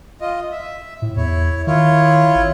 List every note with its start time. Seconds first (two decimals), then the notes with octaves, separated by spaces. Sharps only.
0.21 F4 D#5
0.52 E5
1.02 A2
1.16 E2 E4 C#5
1.67 D#3 E4 F4 C#5
2.35 G#1